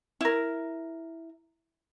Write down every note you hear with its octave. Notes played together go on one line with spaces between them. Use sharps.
E4 A#4